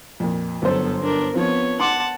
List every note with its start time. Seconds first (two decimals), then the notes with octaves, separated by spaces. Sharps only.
0.20 F2 A#2
0.62 G1 F#2 B3 A4 C5
1.03 D4 A#4
1.34 F3 B3 C4 C#5
1.80 F#5 A5 C6 D6